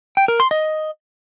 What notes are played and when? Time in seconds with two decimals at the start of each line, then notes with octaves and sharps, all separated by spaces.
0.17 G5
0.28 A#4
0.40 C6
0.51 D#5